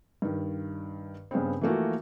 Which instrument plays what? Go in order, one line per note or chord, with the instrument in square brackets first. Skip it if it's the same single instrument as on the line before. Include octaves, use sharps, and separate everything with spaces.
[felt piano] G2 D#3
G2 C#3 B3 C4
E3 F3 A3 A#3 F#4